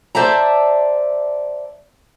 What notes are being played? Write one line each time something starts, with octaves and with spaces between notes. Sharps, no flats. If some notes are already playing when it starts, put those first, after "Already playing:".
C5 D5 E5 A5 A#5